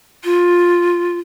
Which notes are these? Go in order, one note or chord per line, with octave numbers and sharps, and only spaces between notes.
F4